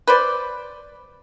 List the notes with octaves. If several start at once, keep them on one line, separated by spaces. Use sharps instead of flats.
B4 C5 D5